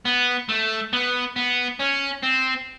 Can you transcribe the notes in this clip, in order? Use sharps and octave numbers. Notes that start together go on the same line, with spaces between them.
B3
A3
B3
B3
C#4
C4